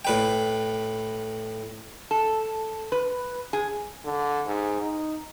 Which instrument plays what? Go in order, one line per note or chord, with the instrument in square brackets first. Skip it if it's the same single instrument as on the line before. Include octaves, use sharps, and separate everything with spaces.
[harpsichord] A2 B4 G5
[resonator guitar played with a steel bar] A4
B4
G#4
[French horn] D3
G#2
D#4